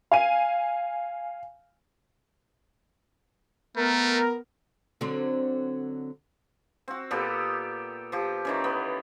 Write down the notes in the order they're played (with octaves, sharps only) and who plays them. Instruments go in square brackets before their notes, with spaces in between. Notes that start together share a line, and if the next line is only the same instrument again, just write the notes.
[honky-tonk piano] F5 G#5 D#7
[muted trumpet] A3 [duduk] B3 [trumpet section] A#4
[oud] D3 F#3 C4
[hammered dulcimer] C4 F#4
A#2 B3 G4 A4
F3 G4
D#3 E3 C#4
B3